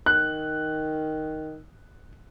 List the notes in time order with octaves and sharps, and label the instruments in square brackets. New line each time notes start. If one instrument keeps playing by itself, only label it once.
[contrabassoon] D#3 [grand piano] F#6